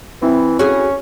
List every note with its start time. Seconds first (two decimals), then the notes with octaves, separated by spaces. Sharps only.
0.22 E3 C4 E4
0.59 C#4 F#4 G#4